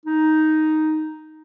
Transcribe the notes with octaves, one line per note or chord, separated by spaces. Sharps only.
D#4